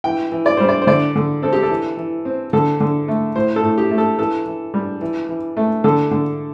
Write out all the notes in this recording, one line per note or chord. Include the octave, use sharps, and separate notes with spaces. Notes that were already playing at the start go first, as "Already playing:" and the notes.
E3 G5
E3
D5
G3 C5
D5
C5
D3 D5
D3
C4 A4
G4
A4
E3
E3
C4
D3 A4
D3
A3
A2 C5
A4
A2
G4
A3
A4
E3 A4
E3
G3
E3
E3
A3
D3 A4
D3